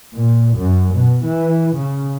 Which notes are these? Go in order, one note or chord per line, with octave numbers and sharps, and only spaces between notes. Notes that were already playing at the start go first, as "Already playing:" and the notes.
A#2
F#2
B2
E3
C#3